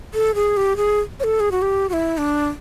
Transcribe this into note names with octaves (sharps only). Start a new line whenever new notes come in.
A4
G#4
G4
G#4
C#5
A4
G#4
F#4
G4
F#4
E4
D4